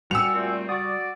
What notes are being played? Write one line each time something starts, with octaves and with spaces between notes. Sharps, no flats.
G3 F#4 F#5 G#5 E6 C#7 F7
A#2 A3 C4
F#4 D5 C#6 D#6